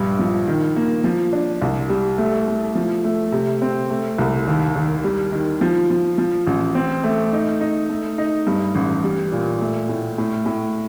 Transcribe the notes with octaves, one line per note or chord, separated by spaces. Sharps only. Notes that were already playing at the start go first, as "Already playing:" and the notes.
Already playing: A#1 G2
F3
D#3
A#3
F3
D4
C2
G3
A3
A3
F3
A3
C3
C4
A3
C2
D#2
D#2
G3
D#3
F3
F3
F3
A1
C4
A3
D#4
D#4
A3
D#4
G2
A1
G3
A#2
A3
A2
A2
A2